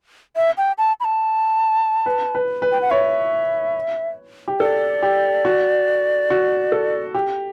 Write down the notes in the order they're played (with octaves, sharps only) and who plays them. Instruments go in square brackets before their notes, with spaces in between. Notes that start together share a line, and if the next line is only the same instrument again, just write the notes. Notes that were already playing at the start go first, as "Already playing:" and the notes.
[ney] E5
G5
A5
B5
A5
[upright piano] B4
B4
B4
[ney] G5
F#5
[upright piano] C#5 [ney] E5
[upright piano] G4
[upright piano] A4 [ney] D5
[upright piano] G4
F#4
F#4
A4
G4